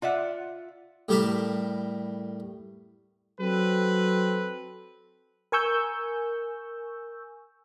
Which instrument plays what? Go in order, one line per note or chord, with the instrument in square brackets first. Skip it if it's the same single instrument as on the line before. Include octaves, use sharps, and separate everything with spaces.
[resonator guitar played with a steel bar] F4 D5 E5 F#5
[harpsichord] A2 G3 G4 A#4 A5 B5
[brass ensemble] F#3 C4 A4 B4
[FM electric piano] A#4 G#5 C#6 E6 G6